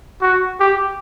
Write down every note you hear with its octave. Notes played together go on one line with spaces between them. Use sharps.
F#4
G4